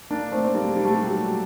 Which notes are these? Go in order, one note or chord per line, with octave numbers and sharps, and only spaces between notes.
A#3 D4
A3 C4
C4
G3 A#3
G3
A3
G3
F#3